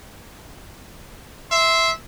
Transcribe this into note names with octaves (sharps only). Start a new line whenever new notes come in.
E5 C6